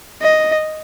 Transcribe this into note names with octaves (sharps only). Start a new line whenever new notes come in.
D#5